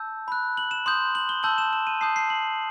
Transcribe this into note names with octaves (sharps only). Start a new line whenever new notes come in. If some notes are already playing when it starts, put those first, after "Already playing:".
Already playing: A5 E6 G6
B5 F#6
F#7
E7
C6 D#6 G6 F#7
F#7
G7
A5 E6 G6 F#7
E7
E7
D#7
A5 D#6 G6 C7
C7
F#7